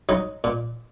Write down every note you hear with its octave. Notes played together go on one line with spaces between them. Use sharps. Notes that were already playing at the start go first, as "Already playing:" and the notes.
F#3 D#4
A#2